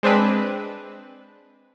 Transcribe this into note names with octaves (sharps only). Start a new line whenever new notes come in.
G#3 C4 D4 B4